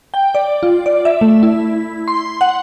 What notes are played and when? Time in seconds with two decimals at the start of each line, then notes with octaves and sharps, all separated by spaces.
0.14 G5
0.35 D5
0.63 F4
0.86 D5
1.05 E5
1.21 A3
1.43 E4
2.08 C6
2.41 F#5